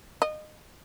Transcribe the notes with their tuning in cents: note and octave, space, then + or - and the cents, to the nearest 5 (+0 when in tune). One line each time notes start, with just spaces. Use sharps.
D#5 -25